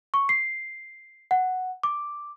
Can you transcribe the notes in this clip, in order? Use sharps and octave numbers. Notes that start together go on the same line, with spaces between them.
C#6
C7
F#5
D6